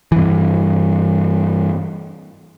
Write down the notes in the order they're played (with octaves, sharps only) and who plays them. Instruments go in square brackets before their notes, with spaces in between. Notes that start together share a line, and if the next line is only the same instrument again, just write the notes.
[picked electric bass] G2 E3